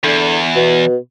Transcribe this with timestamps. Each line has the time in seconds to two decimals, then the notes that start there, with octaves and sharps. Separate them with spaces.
0.04 E2 D3
0.56 B2